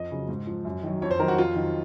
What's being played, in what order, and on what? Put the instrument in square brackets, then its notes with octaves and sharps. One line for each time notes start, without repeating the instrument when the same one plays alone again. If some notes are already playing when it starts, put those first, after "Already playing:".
Already playing: [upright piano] F2 D#5
C#3 F#3
G#2
F3
F#2
D#3 F#3
F2 C#5
C5
D#3 F#3 A#4
F#4
F2 F4
D#3 F#3